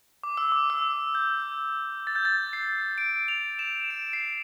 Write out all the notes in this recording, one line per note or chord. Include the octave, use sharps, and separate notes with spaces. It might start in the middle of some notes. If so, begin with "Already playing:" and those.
D6
E6
D6
E6
G6
A6
G6
A6
C7
D7
F7
E7
D7
C7